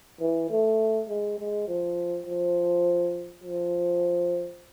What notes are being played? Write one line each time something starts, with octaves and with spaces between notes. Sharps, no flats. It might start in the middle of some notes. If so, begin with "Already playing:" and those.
E3
A3
G#3
G#3
F3
F3
F3